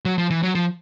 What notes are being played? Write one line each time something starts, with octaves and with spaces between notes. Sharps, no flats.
F#3
F3
E3
F#3
F3